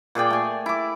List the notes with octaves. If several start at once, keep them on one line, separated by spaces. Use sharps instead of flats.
A#2 G#4 D5 G5
A3 G#5
E4 D6